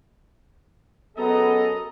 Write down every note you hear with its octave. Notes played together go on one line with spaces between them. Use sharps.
F#2 B3 G#4 A4 D#5 A#5